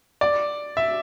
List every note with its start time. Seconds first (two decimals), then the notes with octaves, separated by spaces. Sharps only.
0.21 D5
0.77 E5